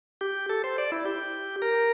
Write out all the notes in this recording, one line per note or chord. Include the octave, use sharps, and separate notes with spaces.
G4
A4
C5
D5
E4
G4
A#4